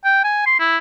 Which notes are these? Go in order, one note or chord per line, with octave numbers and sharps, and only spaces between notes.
G5
G#5
C6
E4